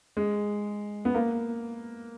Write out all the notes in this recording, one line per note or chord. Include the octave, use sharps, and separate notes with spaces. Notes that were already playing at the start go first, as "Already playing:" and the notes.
G#3
B3
A#3